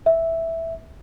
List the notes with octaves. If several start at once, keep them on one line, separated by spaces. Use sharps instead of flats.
E5